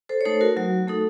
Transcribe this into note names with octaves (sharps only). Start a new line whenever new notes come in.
A4 C5
C#5
A3 D#4 A4 C5
F#4 A#4
F#3 F#4
A3 D#4 A4